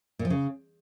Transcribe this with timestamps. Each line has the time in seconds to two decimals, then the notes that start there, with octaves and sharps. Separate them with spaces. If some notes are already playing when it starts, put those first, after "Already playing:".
0.19 A#2
0.25 F3
0.30 C#3